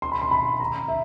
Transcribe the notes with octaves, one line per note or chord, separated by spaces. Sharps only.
C6
B5
C6
B5
A#5
E5